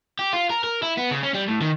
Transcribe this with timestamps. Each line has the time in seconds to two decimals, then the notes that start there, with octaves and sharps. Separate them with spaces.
0.19 G4
0.33 F4
0.50 A#4
0.64 A#4
0.82 E4
0.97 B3
1.11 C#3
1.22 C#4
1.34 G3
1.48 A2
1.61 D#3